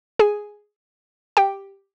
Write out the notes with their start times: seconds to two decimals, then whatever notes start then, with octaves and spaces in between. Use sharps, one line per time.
0.19 G#4 G#5
1.37 G4 G5